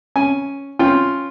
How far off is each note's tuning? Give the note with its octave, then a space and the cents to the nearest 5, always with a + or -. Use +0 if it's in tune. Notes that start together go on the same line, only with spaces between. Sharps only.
C#4 +0 G#5 +0
C#4 +0 F4 +0 G5 +0